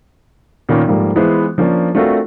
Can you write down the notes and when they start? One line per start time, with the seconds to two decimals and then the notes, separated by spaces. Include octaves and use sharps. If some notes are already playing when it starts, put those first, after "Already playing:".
0.69 A#2 D#3 A#3 B3 C#4
0.88 G#2 F3 G3 A3 A#3
1.16 E3 G#3 B3 E4 F4 C5
1.58 F3 A#3 C#4 D4
1.95 A3 C4 D4 F4 F#4 A#4